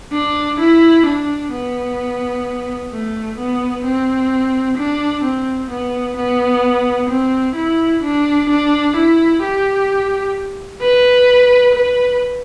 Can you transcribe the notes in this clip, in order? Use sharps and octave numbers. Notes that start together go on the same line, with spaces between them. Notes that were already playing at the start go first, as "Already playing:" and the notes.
D4
E4
D4
B3
A3
B3
C4
D4
C4
B3
B3
C4
E4
D4
D4
E4
G4
B4
B4